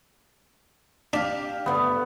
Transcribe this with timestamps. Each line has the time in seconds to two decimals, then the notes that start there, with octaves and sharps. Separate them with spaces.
1.13 D4 G4 F5
1.66 D2 G2 A3 B3